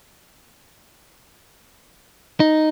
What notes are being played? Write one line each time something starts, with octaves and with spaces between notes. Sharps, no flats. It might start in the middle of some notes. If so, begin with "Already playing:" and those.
D#4